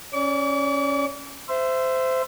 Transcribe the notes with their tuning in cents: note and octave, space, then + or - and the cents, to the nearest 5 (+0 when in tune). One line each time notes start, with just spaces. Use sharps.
C#4 +0 D5 -15 D6 -45
C5 -15 E5 +15